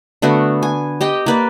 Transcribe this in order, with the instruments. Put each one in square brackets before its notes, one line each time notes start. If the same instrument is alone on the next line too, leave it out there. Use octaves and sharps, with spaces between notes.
[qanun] D3 A3 B3 F#4
G#5
G4 D#5 G5
A#3 B4 D5